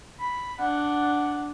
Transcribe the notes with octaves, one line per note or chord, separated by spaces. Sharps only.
B5
D4 F#5